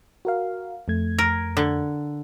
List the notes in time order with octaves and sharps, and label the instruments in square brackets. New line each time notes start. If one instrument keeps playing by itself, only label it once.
[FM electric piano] F#4 A#4 F5
F2 A3 G#6
[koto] A#4
D3